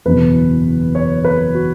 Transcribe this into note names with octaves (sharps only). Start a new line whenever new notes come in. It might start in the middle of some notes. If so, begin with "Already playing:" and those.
F#1 E2 B2 B4
C#5
B4
F#4